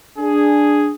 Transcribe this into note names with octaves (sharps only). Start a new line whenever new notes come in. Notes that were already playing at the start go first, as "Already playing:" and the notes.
D4 G#4